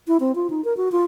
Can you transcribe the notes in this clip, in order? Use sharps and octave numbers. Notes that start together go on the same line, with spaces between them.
E4
C4
F4
D#4
A#4
F#4
F4